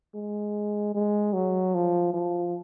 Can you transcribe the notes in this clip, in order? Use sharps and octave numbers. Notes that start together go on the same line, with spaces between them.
G#3
G#3
F#3
F3
F3